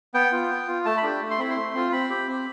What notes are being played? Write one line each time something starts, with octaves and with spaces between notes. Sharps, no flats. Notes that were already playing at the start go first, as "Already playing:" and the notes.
B3 G5
F4
B3
F4
A3 A5
B5
D4 G4
A3
C6
C4 E4 B5
C6
A3
C4 F4
C4 B5
G4
C4